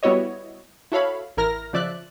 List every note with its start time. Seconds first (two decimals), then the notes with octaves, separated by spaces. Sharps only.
0.03 G3 B3 E4 F#4 C#5 D#5
0.92 E4 F#4 A4 C#5 F5 B5
1.37 A1 E4 A#4 F6 A#6
1.73 C#3 F3 D5 E5 F#6